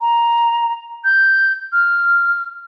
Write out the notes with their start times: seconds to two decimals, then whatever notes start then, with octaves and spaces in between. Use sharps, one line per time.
0.01 A#5
1.05 G6
1.73 F6